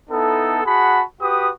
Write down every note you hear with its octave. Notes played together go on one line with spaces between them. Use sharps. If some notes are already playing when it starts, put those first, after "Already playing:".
B3 D#4 E4 A4
F#4 G#4 F#5 A5 B5
F#4 G4 B4 D#6